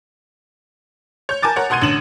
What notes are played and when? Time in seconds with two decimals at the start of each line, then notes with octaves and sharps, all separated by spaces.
1.29 C#5 G6
1.42 A#4 G#5 A5 D6 A6
1.56 A#4 C#5 F#5
1.70 B2 F#5 C6 G#6 D#7
1.81 A1 D3 E7 F#7